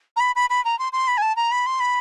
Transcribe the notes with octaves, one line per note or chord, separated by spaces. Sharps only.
A#5
B5
B5
B5
A#5
C6
C6
B5
G#5
A5
A#5
B5
C6
B5